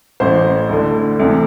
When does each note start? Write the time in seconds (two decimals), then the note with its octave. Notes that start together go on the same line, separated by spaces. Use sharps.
0.20 A1 A2 E3 C5
0.69 D2 D3
1.20 D2 C3 E3